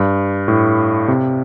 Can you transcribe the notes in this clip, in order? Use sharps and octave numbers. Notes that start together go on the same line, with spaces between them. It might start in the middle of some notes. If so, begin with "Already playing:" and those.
Already playing: G2
A2
C3